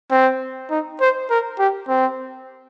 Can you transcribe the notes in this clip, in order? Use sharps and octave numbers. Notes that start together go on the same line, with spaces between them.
C4
D#4
C5
A#4
G4
C4